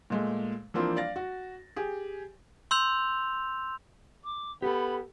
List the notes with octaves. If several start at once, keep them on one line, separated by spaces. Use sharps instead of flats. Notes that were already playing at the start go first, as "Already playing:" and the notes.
A#2 G#3 A3
E3 F3 A#3 C4 D4 F4
D5 F5 A6 A#6
F#4
G4 G#4
C6 E6 G6 F7
D6
B3 G4 A4 B5